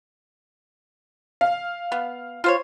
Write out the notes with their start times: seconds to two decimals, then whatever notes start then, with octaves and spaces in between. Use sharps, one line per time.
1.41 F5
1.92 B3
2.44 F4 C5 C#5